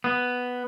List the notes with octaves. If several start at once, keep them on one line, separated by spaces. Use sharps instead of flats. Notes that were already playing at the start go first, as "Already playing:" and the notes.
B3